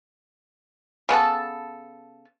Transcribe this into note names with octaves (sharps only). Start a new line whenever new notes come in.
C#3 B3 A4 A5